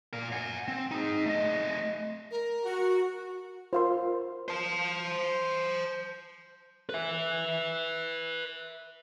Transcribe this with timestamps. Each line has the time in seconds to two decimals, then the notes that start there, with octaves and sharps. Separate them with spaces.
0.13 A#2 A#4
0.32 F#5 G#5
0.68 C4
0.91 D#4 G#4
1.26 A3 D#5
2.31 A#4
2.64 F#4
3.73 F4 A#4 C5 F5 C6
4.48 C5 A5
6.89 B4 E5